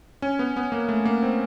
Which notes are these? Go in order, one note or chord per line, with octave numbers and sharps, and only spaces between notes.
C#4
B3
B3
A#3
A3
A#3
C4